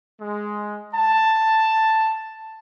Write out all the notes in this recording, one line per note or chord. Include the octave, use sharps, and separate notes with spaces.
G#3
A5